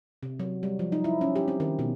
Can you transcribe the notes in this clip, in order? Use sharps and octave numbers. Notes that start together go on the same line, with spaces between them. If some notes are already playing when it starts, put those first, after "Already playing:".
C3
F#3
G3
F3
D#4
E4
C#4
G4
C4
D#3
B2